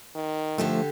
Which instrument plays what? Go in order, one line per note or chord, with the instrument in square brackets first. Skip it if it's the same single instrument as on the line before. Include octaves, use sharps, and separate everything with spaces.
[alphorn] D#3
[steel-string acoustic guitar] D3 G4 A4 [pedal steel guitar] F3 A3